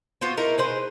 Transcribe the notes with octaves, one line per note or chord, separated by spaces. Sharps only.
B3 F4 F#4 C5
D#4 E4 A#4
G#4 B4 C5